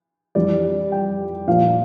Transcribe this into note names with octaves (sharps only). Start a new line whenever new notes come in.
F2 E3 G3 D5
G5
A#2 F3 A#3 F5